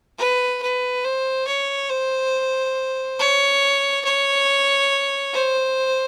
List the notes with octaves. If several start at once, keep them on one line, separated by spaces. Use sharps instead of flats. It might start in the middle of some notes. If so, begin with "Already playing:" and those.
B4
B4
C5
C#5
C5
C#5
C#5
C5